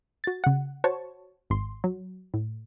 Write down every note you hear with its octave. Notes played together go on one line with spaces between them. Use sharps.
F#4 A6
C#3 F#5
F#4 C5 C#5 A5 C#6
G#1 C6
F#3
A2